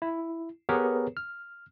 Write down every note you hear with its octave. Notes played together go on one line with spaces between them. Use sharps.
E4
B3 G4 G#4 A#4 B4 C#5
F6